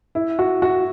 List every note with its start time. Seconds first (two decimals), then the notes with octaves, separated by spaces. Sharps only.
0.15 E4
0.39 F#4
0.62 F#4